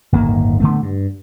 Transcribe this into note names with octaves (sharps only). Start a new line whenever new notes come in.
D1 G1 D#3 A#3
D3 A3 B3
G2